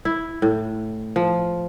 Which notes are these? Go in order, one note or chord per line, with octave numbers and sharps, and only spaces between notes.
E4
A2
F3